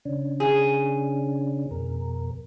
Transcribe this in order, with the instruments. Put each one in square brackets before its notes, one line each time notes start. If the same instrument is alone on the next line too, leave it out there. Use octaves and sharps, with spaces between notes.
[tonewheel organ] C#3 C#4 D4
[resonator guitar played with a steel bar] G#4
[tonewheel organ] F2 B2 A#4